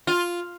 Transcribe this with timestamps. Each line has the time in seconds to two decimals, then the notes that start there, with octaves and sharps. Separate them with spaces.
0.07 F4